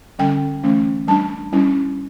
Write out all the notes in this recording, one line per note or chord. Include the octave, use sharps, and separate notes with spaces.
D3 G3 C#4 G5
E3 A3 C#4
G3 D4 A5
G3 C#4 E4